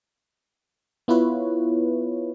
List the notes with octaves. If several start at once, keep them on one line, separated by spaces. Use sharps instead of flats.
B3 E4 F4 B4 C#5